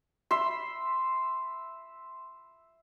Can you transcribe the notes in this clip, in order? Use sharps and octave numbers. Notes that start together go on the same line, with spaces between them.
E5 B5 C6